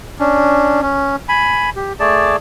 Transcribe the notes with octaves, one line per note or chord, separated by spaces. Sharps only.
C#4 D4
C#4
G#5 B5
G4
A3 G#4 D5 A5